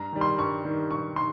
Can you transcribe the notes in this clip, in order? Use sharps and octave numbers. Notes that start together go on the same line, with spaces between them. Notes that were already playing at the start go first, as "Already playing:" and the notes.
Already playing: G2 A#5
D#3 G3
C6
G2 C#6
D#3 G3
G2 C#6
D#3 C6